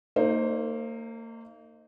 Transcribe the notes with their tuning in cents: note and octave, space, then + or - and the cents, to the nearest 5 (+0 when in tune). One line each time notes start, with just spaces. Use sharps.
A#3 -35 D#4 +0 C5 +15